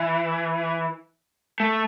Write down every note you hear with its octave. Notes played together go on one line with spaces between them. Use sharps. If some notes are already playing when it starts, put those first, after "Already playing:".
Already playing: E3
A3